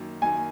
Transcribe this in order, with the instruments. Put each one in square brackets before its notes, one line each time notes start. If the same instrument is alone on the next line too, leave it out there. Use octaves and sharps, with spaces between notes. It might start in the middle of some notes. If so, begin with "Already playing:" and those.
Already playing: [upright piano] F#2 D#3 A#3
[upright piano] F#2 D#3 A#3 [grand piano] G#5